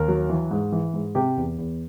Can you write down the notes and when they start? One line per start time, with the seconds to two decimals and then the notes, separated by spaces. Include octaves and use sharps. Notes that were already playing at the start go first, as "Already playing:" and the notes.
Already playing: D#2 A#4
0.08 F#3
0.30 E3
0.51 G#2
0.72 E3
0.94 G#2
1.15 C3 G4
1.37 E2
1.58 E2